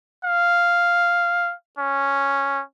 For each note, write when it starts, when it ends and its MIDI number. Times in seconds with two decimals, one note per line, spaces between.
0.24 1.54 77
1.79 2.62 61